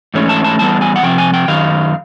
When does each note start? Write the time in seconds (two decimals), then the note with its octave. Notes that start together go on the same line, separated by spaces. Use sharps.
0.14 G#2 E3 A3 C#4
0.29 A5
0.44 A5
0.59 G#2 E3 G3 B3 A5
0.81 G#5
0.96 F#5
1.03 C3 F3 G5
1.18 G#5
1.34 G5
1.48 F#2 D#3 F5